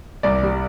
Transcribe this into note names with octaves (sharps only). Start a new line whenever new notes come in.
C2 D5
G3